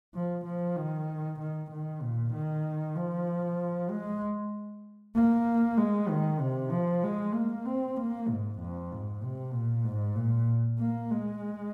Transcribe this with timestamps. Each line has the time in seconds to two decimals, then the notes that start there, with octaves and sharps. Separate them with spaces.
0.15 F3
0.45 F3
0.77 D#3
1.40 D#3
1.71 D#3
2.02 A#2
2.34 D#3
2.96 F3
3.90 G#3
5.15 A#3
5.78 G#3
6.09 D#3
6.40 C3
6.71 F3
7.04 G#3
7.34 A#3
7.65 C4
7.97 A#3
8.28 G#2
8.60 F2
8.91 G#2
9.23 C3
9.53 A#2
9.85 G#2
10.16 A#2
10.79 A#3
11.11 G#3